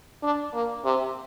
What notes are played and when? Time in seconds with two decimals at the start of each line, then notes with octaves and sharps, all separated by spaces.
0.23 D4
0.54 A#3
0.85 C3